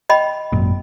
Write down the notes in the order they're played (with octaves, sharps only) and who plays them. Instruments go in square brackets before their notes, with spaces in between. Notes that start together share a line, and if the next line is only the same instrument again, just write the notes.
[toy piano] D#5 G5 B5
[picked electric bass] G#1 F#2 A#2